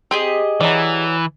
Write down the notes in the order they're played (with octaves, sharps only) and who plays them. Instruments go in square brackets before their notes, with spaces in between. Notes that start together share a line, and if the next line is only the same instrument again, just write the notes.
[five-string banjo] C4 [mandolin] G4 G#4 D#5
[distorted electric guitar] E3 [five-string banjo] F#3 D5